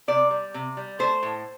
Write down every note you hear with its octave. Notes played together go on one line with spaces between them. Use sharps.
C3 D5
G3
C3
G3
A3 C5
A2